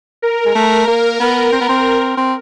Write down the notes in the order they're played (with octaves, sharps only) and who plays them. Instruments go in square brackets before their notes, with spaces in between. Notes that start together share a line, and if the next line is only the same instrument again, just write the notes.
[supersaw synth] A#4
[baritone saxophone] G#3
A3
A#3
B3
C4
B3
C4
C4